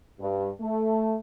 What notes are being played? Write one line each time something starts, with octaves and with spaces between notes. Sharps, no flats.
G2
A3